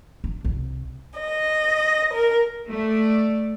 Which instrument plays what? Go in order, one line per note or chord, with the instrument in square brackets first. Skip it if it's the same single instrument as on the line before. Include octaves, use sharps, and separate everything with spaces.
[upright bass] D4
C2
[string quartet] D#5
A#4
[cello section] A3 D5